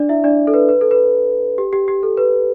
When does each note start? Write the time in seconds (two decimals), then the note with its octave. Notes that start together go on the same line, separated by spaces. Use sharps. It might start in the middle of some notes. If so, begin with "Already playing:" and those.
Already playing: D4 D5
0.09 E4 E5
0.24 D4 D5
0.47 A4
0.54 B4
0.69 B4
0.81 A4
0.91 B4
1.58 G4
1.73 G4
1.88 G4
2.03 A4
2.17 B4